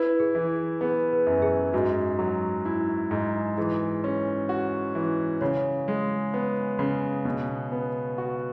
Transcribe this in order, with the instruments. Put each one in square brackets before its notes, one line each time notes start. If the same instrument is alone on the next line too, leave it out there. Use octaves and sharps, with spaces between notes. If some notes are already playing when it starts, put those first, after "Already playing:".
Already playing: [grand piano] E4 [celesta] B4
[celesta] G#4
[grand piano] E3
[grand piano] B3 [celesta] G#4
[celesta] B4
[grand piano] F#2
[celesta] G#4
[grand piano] G#2 [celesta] F#4
[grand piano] F#3
E4
G#2
[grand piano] E3 [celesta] G#4
[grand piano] C#4
F#4
E3
[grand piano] C#3 [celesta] C#5
[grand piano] G#3
B3
C#3
B2
B3
F#4